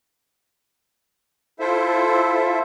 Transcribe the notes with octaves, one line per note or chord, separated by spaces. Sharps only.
E4 F4 A4 C5 E5